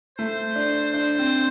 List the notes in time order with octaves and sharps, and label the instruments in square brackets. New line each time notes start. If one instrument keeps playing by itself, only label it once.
[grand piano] A3 [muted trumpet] C5
[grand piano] D4
[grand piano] D4 [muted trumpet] C5
[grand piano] C4